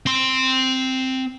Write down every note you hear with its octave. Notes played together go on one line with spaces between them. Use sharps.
C4 C6